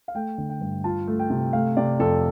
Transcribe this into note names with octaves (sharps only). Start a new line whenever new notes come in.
F5
A3 G5
D3
G5
G2
F4 A5
A3
G5
C3
A3 F5
C3 D5
F2 A4